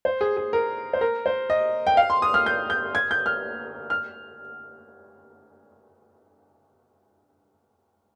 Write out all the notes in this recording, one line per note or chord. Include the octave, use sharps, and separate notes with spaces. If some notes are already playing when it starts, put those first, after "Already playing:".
C5
G#4
G#4
A#4
C5
A#4
C5
D#5
G5
F5
C6
D#6
F6
G6
G6
G#6
G6
F6
F6